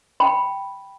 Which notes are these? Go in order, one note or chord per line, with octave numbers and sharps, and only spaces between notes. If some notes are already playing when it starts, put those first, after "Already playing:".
G5 B5